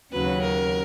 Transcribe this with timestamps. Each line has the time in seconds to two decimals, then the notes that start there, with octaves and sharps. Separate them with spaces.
0.12 D#2 C#3 F#3 B4
0.42 A#4